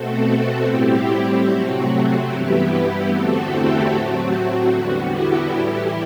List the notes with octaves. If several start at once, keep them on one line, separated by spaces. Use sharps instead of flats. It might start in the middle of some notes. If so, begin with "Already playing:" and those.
Already playing: B2 A3 C4 F#4 A4
F#4 A4
A2 G3 C4 E4 G4
C3 F#3 A3 C4 F#4
G2 E3 G3 B3 E4 G4
E2 D3 A3 C4 F#4 A4
E4 G4
A2 F#3 A3 C4 F#4
F#4
E2 D3 G3 B3
E4 G4
A2 E3 G3 E4 G4